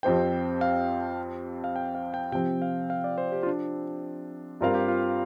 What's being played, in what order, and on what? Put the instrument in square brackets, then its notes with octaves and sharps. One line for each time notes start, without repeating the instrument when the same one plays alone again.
[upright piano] F2 F3 C4 G4 C5 [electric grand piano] G5
[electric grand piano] F5
F5
G5
F5
G5
[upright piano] C3 F3 C4 [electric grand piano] G5
[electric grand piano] F5
F5
D5
C5
G4
F4
D4
[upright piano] G2 G3 C4 A#4 F5 [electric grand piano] F4
[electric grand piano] G4
F4